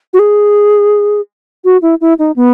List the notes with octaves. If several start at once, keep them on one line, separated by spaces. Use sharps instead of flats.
F#4
G#4
F#4
E4
E4
D#4
B3